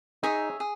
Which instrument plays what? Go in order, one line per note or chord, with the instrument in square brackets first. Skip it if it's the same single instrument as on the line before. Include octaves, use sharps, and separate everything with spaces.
[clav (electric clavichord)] D#4 [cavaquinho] G#4 C#5 E5
[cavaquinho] G#4